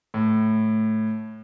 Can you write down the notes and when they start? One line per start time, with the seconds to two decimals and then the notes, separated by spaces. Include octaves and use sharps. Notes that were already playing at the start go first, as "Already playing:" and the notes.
0.14 A2